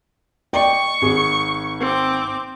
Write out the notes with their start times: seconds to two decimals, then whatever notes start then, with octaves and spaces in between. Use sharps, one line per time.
0.53 D5 D#5 G5 C#6
1.02 G#1 G#4
1.80 C4 D6